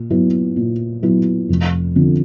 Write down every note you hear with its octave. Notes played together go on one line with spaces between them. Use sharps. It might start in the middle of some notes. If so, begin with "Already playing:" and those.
Already playing: A#2
F#3 B3 E4
A#2
F#3 B3 E4
F1
F2 D3 F3